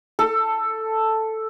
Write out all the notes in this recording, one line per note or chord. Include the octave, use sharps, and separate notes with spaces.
A4